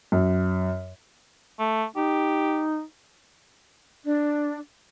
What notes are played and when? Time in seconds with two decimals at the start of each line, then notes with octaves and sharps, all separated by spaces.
0.12 F#2
1.59 A3
1.96 D#4 G4
4.04 D4